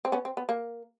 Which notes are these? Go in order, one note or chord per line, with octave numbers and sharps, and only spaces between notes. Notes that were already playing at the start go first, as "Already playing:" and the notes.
C4
B3 C#4
C4
B3
A#3